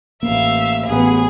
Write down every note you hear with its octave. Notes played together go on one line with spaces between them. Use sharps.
A1 A#3 E5 F5
A1 B3 G#4